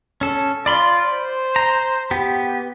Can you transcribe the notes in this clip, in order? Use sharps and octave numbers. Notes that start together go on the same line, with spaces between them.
C#4 A4
F4 D5 B5 C6
C5
A#5
B3 G4